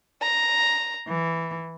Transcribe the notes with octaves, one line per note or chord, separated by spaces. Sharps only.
A#5
E3